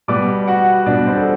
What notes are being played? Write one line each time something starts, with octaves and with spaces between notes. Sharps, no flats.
B2 G3 B3 D5 D6
F#4 F#5
B2 G3 B3 D4 D5
C4 C5
A4